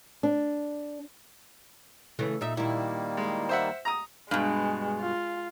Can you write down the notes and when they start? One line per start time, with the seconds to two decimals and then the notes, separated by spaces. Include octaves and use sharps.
0.23 D4
2.19 C#3 E3 A3
2.41 A#2 D#4 E5
2.57 A#2 D#3 G3 A#3 E4
3.17 G#3
3.49 C5 E5 F#5
3.85 A#5 D#6
4.31 G2 B2 G#3
4.99 F4